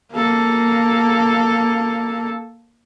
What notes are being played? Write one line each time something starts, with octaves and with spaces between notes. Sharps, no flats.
A#3 A4